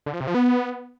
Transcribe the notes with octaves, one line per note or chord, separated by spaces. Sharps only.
D3
F3
C3
F3
B3